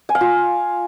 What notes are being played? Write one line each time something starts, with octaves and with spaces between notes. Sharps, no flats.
G#5
F5
F4